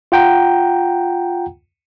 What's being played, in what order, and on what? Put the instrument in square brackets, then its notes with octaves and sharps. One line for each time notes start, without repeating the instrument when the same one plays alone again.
[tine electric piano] F4 F#5 G5 A#5